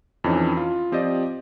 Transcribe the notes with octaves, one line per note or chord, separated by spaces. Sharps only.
F2 E3 C#4 D#4
F4
F3 C4 G4 D5 D#5